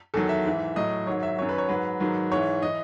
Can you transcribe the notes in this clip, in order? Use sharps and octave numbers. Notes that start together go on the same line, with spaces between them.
E2 D#3 F#3 A4
E5
G#2 E3
A2 F#3 D#5
G#2 D#3 F#3 C#5
E5
F#2 D#3 F#3 C#5
B4
C#5
G#2 F#3 B4
G#2 D#3 F#3
G#2 E3 C#5
E3 D#5